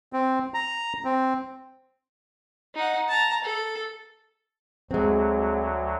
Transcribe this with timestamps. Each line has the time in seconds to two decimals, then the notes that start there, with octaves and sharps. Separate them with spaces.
0.13 C4
0.54 A#5
1.05 C4
2.75 D#4 F#5
3.09 A5 A#5
3.44 A4
4.91 D2 F#3 G#3 C4